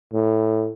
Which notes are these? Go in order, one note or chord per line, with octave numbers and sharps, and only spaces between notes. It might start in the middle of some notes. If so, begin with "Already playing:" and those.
A2